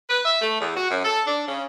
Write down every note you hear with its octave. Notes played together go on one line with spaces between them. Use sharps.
B4
E5
A3
E2
F#4
F#2
A4
D4
C#3